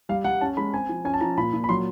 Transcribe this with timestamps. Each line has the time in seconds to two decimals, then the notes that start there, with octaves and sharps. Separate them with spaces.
0.09 G3 F5
0.24 G3 F#5
0.41 C#4 A5
0.57 G#3 B5
0.74 C4 G#5
0.89 F3
1.05 C#4 G#5
1.14 A5
1.21 F3 A#5
1.38 A#2 B5
1.53 A#2
1.64 B5
1.69 F#3 C6